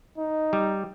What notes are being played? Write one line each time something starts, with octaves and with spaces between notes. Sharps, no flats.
D#4
G3